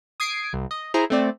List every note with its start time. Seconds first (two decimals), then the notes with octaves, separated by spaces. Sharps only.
0.20 D#6 G#6 C7 D7
0.53 C2
0.71 D#5
0.94 E4 G#4 C5 A#5 C7
1.10 A3 C4 D5